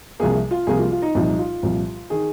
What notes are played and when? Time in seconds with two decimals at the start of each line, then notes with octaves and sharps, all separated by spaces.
0.20 C2 C3 F3 A#3 G#4
0.51 F4
0.67 C2 C3 F3 A#3 G#4
0.79 F4
0.91 F4
1.02 D#4
1.15 C2 A#2 F3 D#4
1.38 F4
1.63 C2 A#2 F3
2.10 D#3 G#4